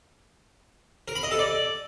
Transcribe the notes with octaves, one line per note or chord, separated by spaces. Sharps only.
A#4
B5
D#5
A4
D5